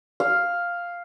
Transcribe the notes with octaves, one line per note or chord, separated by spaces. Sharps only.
F5